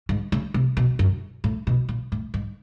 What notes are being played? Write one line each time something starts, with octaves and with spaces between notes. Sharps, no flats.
G#2
C#3
C3
B2
F#2
A2
B2
A#2
A2
G#2